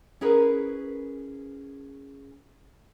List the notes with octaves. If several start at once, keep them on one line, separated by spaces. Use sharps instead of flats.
C#4 E4 G#4 A#4 B4